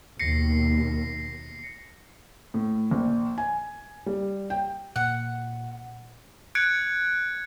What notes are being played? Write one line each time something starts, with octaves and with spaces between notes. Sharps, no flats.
D#2 B2 A#6 C7 C#7
A2
A#1
G#5
G3
G5
A#2 F#5
F#6 G#6 C#7 D7